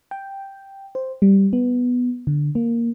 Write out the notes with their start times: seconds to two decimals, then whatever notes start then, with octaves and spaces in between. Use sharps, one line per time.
0.11 G5
0.95 C5
1.22 G3
1.53 B3
2.27 D3
2.55 A#3